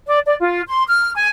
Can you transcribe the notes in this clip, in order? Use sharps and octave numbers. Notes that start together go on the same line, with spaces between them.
D5
D5
F4
C6
F6
G#5